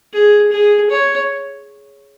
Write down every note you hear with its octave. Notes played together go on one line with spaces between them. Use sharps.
G#4
G#4
C#5